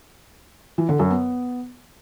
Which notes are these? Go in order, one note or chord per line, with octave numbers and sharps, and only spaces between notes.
E3
D3
F#2
B3